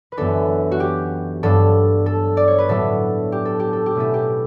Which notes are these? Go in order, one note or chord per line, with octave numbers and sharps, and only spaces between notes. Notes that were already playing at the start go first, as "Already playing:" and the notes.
B4
F#2 E3 B3 D4 A4
F#4
G4
G2 F#3 B3 D4 A4
A4
D5
C#5
B4
A2 F#3 B3 D4 A4
G4
A4
G4
A4
G4
B2 A3 C#4 E4 A4
G4